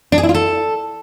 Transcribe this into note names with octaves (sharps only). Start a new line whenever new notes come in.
D4
G#4
E4
F4
A4